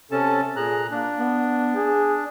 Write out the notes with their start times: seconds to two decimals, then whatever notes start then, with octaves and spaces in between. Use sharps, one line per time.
0.11 C3 C#4 A4 A5
0.56 A#2 G#4 A#5 F#6
0.91 A#3 D4
1.18 B3
1.75 G#4